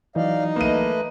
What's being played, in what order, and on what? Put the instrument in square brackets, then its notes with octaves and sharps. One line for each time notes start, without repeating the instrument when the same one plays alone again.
[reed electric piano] E3 F#3 [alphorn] D#4 [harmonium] D5 D#5 F5
[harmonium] A3 B4 D#5 [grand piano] A#3 D#7